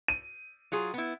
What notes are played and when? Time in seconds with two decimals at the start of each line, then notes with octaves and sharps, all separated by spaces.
0.08 D#7
0.72 F#3 F4 G#4
0.94 B3 E4